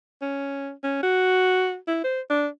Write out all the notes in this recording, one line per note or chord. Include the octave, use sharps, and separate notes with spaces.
C#4
C#4
F#4
E4
C5
D4